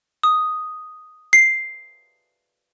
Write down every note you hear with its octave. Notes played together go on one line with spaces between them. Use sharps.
D#6
C7